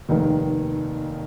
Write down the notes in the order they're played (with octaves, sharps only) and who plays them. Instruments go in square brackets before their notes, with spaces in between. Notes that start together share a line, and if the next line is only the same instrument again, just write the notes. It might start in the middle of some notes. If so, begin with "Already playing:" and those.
[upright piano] F1 D#2 D#3